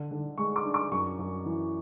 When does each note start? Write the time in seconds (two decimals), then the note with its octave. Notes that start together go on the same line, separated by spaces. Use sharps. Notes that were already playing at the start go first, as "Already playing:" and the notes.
Already playing: D3
0.11 D3
0.38 G#3 C#6
0.56 D6
0.65 D4
0.74 D6
0.92 F#2 C#6
1.19 F#2
1.46 E3